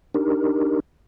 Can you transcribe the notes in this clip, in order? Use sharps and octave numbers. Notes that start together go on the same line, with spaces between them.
D4 D#4 G4 A#4